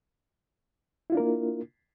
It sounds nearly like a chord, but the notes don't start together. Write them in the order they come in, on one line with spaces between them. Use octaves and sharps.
E4 F4 D4 A#4 A#3